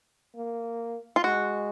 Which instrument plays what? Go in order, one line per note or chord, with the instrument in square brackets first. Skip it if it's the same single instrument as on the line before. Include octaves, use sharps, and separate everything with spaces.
[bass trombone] A#3
[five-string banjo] F4
[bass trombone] G#3 [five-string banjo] F#4